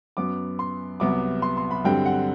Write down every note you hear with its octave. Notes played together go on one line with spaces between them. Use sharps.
F#2 F#3 B3 D6
C6
C2 C3 F#3 B3 D6
C6
C6
B5
G2 D3 F#3 C4 G5
F#5